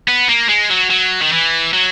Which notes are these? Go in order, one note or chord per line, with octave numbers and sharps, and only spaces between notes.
B3
A#3
G#3
F#3
F#3
D#3
E3
F#3